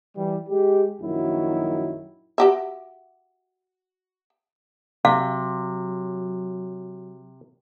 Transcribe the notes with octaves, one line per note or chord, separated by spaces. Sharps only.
E3 G3
G#3 G4
A#1 F#2 D#3 F#3 E4
F#4 G4 E5
C3 F#3 F5